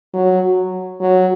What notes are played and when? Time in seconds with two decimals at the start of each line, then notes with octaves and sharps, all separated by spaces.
0.14 F#3
1.01 F#3